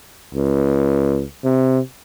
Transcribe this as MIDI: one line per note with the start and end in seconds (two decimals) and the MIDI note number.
0.35 1.23 37
1.44 1.79 48